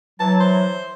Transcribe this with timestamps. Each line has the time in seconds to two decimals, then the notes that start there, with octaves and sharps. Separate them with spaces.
0.20 E3 F#3 A5
0.40 C5